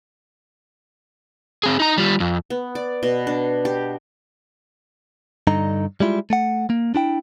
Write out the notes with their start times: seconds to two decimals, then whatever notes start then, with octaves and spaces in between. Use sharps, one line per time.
1.63 C4 G#4
1.80 D#4 A#5
1.98 G3 F4
2.20 F2
2.50 B3
2.75 D5
3.03 B2
3.27 D4
3.65 G4
5.47 G2 D3 D#4 A#5
6.00 G3 G#3 E4 F4
6.30 A3 F#5
6.70 A#3
6.95 D4 E4 G5